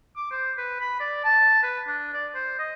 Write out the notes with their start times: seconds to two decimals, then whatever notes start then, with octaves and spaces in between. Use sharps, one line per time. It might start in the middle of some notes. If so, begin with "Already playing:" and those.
0.16 D6
0.31 C5
0.57 B4
0.80 B5
1.00 D5
1.24 A5
1.63 B4
1.87 D4
2.13 D5
2.35 C5
2.59 D#5